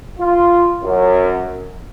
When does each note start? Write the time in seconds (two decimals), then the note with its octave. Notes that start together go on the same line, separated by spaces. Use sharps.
0.19 F4
0.83 F#2